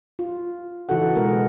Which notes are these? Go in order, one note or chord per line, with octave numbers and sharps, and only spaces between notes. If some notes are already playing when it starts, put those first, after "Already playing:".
F4
C#3 E3 D#4 F#4 A4 F#5
B2 G#3 B3 G#4 A#4